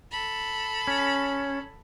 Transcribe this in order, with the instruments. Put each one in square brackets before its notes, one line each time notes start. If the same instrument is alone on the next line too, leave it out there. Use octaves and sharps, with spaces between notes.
[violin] A4 B5
[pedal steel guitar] C#4